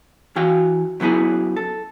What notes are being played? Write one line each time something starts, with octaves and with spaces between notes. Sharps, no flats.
E3 F#4 F5 G5
C#3 F#3 B3 E4 G#4
A4